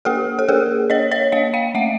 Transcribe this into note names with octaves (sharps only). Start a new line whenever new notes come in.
A#3 G4 A4
A4
A#3 G#4 A#4
A#3 C#5 D#5
C#5 D#5
A#3 D#5 F5
F5 G5
A3 E5 F#5